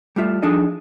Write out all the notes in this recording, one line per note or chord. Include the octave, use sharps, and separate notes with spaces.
G3 A3 F4 E5
F3 D4 D#4 G#4 A4 D#5